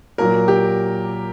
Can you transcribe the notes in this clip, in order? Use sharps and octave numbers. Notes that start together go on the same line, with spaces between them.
A#2 F#3 A#3 A#4
G4